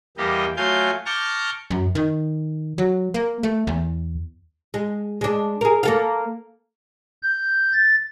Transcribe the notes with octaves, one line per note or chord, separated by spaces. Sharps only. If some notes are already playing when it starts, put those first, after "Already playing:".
E2 G3 A#3 G4 D#5
F#3 A3 F4 F5 G#5 G6
A5 A#5 C#6 D6 F6 G6
F#2
D#3
F#3
A#3
A3
E2
G#3
G#3 D4
G#4 A#4
A#3 A4 F5
G6
A6